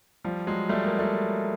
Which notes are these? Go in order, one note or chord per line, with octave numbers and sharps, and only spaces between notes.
F3 G3
F#3 G#3
G3 A3
G#3 A#3
G3 A3